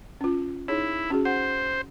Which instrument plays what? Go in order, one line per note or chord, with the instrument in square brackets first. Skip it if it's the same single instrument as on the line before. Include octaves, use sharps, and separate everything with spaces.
[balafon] C#4 F4
[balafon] D#4 G#4 C#5 [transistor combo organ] E4
[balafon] C#4 F#4 G#4
[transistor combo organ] C5 [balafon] F#5